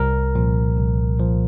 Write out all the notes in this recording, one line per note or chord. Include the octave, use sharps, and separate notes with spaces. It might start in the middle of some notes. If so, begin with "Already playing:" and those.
Already playing: C2 A#4
A#2 F3
C2
A#2 F3